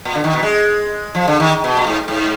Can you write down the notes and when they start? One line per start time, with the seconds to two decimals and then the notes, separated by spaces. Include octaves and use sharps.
0.05 A#2
0.15 D3
0.24 D#3
0.33 B2
0.43 G#3
1.15 F3
1.28 D3
1.40 D#3
1.64 B2
1.77 A#2
1.87 G#2
2.08 G#2